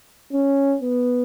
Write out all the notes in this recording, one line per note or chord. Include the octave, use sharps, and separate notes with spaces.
C#4
B3